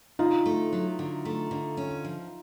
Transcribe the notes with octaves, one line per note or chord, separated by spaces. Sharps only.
D3 D#4 F4
A3
F#3
D3
A3
D3
C#4
F3